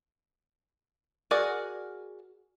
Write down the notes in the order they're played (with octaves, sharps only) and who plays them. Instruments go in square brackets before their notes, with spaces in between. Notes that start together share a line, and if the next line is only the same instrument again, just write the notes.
[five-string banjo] F#4 G#4 A#4 D5 F#5